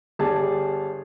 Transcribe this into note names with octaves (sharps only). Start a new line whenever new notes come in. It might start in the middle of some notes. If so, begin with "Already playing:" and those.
G1 G3 G#4 A5